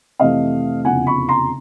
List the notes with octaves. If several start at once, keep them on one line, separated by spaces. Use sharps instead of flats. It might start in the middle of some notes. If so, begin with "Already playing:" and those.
F2 C3 E3 A3 D#5 F5
F1 E2 C#3 F3 F#5 G#5
B5 C#6
A#5 C6